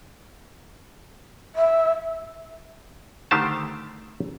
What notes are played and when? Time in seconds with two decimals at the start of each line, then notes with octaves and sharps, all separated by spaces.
1.55 E5
3.31 D3 D#3 A3 G4 C5 A5